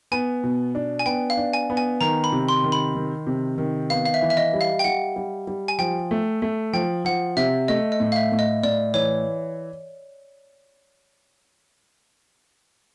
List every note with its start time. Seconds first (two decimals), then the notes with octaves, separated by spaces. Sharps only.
0.12 B3 G#5
0.43 B2
0.75 D4
0.99 G#5
1.06 B3 G5
1.30 F5
1.37 D4
1.54 G#5
1.70 B3
1.77 G#5
2.01 D#3 A#5
2.24 B5
2.32 C3
2.49 C6
2.64 D#3
2.72 B5
2.95 D#3
3.27 C3
3.58 D#3
3.90 B3 F5
4.05 F5
4.14 E5
4.22 E3
4.30 E5
4.37 D#5
4.53 G3
4.61 F5
4.79 G5
4.84 G3 F#5
5.16 G3
5.47 G3
5.68 G#5
5.79 F3 G5
6.11 A3
6.42 A3
6.73 F3 G5
7.05 F3 F#5
7.37 C3 E5
7.68 A3 D#5
7.92 D#5
8.00 A2
8.12 F5
8.16 E5
8.32 A2
8.39 D#5
8.63 A2 D5
8.94 E3 C#5